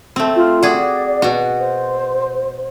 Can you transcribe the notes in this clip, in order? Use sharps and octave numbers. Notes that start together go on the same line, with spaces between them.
A3 C4
F4
F#4 G#4 D5
B2 F#4
C5